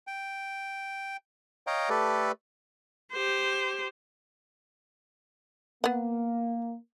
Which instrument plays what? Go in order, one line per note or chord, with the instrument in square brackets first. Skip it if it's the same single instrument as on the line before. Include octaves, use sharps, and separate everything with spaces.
[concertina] G5
C#5 D#5 F5 G5 A#5
A3 G4 A4 B4 D5
[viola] G4 C5
[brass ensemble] A#3 [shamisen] B3 F#5